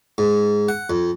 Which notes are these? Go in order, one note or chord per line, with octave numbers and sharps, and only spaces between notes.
G#2
F#5
F2